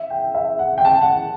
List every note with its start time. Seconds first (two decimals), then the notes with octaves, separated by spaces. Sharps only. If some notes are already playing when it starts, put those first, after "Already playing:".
Already playing: E5
0.10 G5
0.34 E5
0.59 F#5
0.78 G5
0.85 A5
1.02 F#5